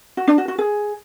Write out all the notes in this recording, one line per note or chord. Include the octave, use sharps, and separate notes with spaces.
F#4
D4
F#4
F#4
G#4